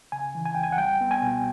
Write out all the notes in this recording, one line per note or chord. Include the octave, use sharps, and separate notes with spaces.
C#3 G#5
E3
G#5
C#2 G5
G#5
F#5
G3 G5
B3
G#5
B2